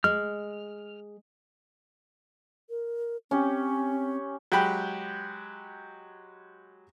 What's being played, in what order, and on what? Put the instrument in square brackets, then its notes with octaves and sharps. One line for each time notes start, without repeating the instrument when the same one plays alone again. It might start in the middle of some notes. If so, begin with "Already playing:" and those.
[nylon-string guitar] G#3 [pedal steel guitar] F6
[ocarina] A#4
[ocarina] C4 [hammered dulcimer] C#4 G4
[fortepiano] F#3 G#3 G4 G5 B5